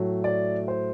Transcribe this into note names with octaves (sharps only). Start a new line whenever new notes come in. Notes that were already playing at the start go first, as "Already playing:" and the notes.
Already playing: A2 F#3 A3
D5
C5